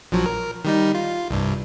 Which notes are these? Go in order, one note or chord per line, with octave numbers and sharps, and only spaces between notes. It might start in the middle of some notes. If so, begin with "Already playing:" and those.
A#1 F3 F#3
A#4
D#3 G3 D#4
F4
C2 G2